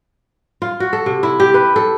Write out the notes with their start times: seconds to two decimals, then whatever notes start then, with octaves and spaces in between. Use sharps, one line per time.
0.62 F4
0.80 F#4
0.93 A4
1.06 C3
1.23 E4
1.40 G4
1.54 B4
1.76 A4